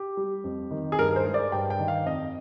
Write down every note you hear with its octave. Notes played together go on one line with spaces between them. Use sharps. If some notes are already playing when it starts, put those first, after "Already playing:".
Already playing: G4
G3
F2
D#3
G#4
G2 A#4
A#4
C5
G#3
D5
G2 G5
G5
D#3
F5
F2 D#5